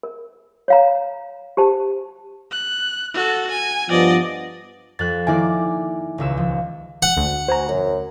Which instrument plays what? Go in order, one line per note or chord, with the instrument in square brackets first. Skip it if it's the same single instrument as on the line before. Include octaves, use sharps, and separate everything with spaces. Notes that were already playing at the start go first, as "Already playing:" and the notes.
[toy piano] A#4
C#5 F5 A#5
G4 C5 A5
[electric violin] F#6
F#4 A4
G#5
[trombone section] G2 F3 B3 [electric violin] D5 D#5
[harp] F2 F#6 [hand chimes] A6
[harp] D#3 A#3 D5 [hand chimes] E4 E5 G#5
[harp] D#1 C#2 E6
F3
[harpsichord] F#5
[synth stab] D2
[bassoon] F#4 [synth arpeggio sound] C5 G#5 A#5
[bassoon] F#2